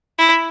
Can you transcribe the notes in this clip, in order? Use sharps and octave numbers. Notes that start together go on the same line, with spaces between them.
E4